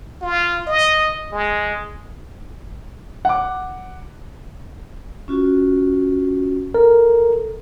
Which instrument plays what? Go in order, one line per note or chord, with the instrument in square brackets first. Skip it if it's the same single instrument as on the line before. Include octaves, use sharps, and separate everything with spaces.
[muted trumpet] F4
D#5
G#3
[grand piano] F#5 D6
[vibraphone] C#4 F4 F#4
[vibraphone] A4 [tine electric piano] A#4